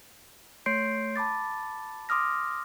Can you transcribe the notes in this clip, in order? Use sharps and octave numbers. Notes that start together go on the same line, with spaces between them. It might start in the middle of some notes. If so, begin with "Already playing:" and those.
A3 C#5 C6 G6 C7 D7
A5 B5 D6 A6
C6 D6 D#6 F6 A#6